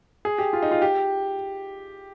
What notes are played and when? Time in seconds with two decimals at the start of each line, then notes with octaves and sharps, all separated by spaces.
0.25 G#4
0.38 G4
0.53 F4
0.62 D#4
0.71 F4
0.82 G4